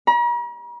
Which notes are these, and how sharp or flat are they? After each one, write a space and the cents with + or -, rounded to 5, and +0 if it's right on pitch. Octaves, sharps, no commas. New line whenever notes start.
A#5 +45